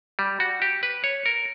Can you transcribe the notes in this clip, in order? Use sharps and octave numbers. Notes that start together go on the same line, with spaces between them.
G3
F#4
G4
B4
C#5
A#4